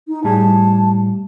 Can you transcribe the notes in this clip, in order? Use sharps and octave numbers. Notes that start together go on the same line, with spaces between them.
D#4
A2 G3 G#4 A5